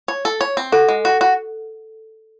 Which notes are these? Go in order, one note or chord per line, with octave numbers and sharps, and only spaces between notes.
C#5
A4
C#5
C4
F#4 A4
G#3
F#4
F#4